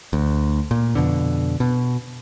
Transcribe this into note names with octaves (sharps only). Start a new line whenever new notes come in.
D2
A#2
F2 B2 D3
B2